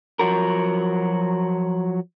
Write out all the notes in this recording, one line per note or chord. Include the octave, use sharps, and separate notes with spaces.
F3 F#3 F#4 A#4